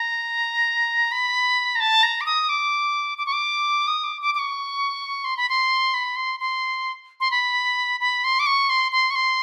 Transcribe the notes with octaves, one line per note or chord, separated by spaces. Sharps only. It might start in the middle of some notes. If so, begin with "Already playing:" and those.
Already playing: A#5
B5
A#5
A5
A#5
D6
D#6
D6
D6
C#6
D6
D#6
D6
D6
D6
C#6
C6
B5
C6
B5
C6
C6
C6
B5
B5
C6
D6
C#6
C6
C6
C#6
C6